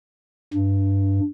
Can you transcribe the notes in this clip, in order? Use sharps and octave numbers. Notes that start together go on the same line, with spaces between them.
G2